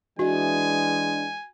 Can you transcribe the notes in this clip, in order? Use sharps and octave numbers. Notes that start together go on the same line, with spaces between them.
E3 G#3 D4 F#4 G#5